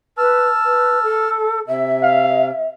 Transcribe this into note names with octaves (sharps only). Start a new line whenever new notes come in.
B4 A5 E6 F6
B4
A4
C3 E5
F5